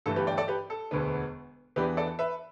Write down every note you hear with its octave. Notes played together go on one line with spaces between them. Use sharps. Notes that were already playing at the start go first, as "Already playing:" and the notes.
G1 G2 E3 A3 A4
G4 B4
D5 G5
A4 D5
G4 B4
A4
E1 D2 D3 B3
E2 E3 B3 D4 G4 B4
A4 D5
B4 E5